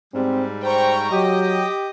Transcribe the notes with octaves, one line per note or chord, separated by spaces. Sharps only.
G#2 G3 C4
C5 G5 A#5 C#6
F#3 G4 D#5